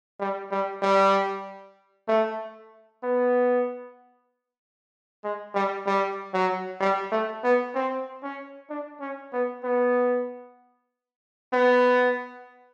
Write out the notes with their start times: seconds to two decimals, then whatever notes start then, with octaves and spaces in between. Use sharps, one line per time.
0.20 G3
0.51 G3
0.82 G3
2.08 A3
3.04 B3
5.24 G#3
5.55 G3
5.87 G3
6.34 F#3
6.81 G3
7.12 A3
7.44 B3
7.75 C4
8.23 C#4
8.70 D4
9.01 C#4
9.33 B3
9.64 B3
11.53 B3